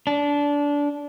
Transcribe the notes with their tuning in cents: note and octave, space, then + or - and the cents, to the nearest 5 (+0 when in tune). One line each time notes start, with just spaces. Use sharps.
D4 -20